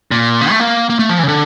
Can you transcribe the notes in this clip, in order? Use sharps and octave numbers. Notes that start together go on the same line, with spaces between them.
A#2
C#3
A3
A#3
A#3
A3
F3
E3
C#3
D3